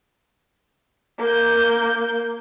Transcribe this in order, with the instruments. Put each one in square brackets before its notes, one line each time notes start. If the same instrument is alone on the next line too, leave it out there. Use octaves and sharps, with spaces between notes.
[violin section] A#3 G6